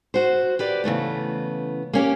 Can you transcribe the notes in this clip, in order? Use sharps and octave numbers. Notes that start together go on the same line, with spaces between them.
F#4 C5
G4 B4 D5
C#3 E3 A3 B3
A#3 C#4 G4